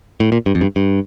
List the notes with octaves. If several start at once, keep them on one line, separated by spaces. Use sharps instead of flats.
A2
A#2
G2
F2
G2
G2